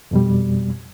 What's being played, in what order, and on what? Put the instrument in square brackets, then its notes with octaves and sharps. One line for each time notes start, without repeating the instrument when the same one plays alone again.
[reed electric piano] F2 B2 G3